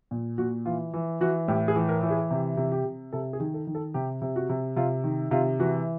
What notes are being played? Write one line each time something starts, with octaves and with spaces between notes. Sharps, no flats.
A#2
A#2 F#4
E3 F4
E3
E3 F#4
A2 G4
G#4
E3
A#4
E3
G#4
C3 G4
C3
G4
C3
C3 A4
G#4
D#3
A4
D#3
A4
C3 G4
C3
F#4
C3
C3 F4
D#3
C3 F4
E3 F#4